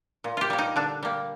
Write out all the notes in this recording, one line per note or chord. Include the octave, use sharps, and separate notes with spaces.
A#2
F4 G4
G3 A#3
D#4
D3 D4
G3 A#3